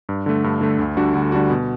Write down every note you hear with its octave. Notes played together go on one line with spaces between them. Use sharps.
G2
D3 A3
G2
D3 A3
D2
D3 G3 D4 F#4
D2
D3 G3 D4 F#4
B2